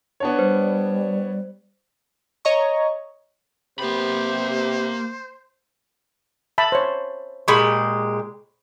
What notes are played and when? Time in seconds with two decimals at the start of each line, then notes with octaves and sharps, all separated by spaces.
0.20 B3 D4 C#5
0.39 G3 C5
2.45 C#5 D#5 A#5 C#6
3.79 C3 A#3 B3 G4 C5 B5
6.58 E5 A5 B5
6.72 C5 C#5
7.48 A#2 G#3 G4 B5 C#6